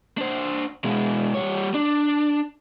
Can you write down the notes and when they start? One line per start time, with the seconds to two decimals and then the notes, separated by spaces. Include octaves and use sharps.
0.18 D4 C5
0.84 B2 G#3
1.35 G3 C#5
1.74 D4